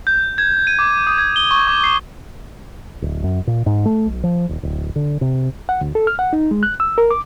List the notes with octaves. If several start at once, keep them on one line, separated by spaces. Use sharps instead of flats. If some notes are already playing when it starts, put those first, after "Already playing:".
G6
G#6
D#7
D6
D#6
G#6
G7
C#6
D6
C7
D1
F#2
A#2
G#2
A3
B1
F3
D#1
D1
D3
C3
F#5
D2
A4
F6
F#5
D#4
G#3
F#6
E6
A#4
D6